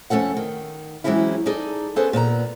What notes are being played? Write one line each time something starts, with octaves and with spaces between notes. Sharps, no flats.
F2 A3 C#4 A4 F#5
D#3
E3 F#3 G#3 C4 C#4 E4
D#4 G#4 A4 D5
B3 C#4 D4 G#4 A4 C5
A#2 B3 A5 A#5